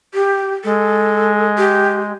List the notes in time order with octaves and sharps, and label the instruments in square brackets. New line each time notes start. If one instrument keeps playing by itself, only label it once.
[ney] G4
[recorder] G#3 [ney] A4
[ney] G4